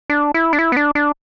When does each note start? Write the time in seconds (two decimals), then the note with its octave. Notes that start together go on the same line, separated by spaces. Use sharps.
0.10 D4
0.34 E4
0.53 D4
0.59 E4
0.72 B3
0.77 D4
0.95 D4